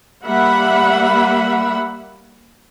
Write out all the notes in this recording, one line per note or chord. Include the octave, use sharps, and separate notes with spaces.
G3 A#3 E5 F#5 B5